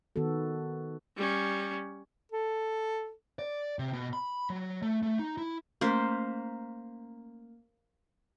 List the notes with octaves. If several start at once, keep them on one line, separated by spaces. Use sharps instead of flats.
D#3 B3 F#4 A4
G3 C#4
A4
D5
C3
B2
B5
F#3
A3
A3
D#4
E4
A3 A#3 C#4 C5 C7